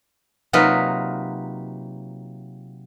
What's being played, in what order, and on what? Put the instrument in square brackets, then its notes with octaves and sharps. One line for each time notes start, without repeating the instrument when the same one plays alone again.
[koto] C3 F#3 A#3 D#4 F4 B4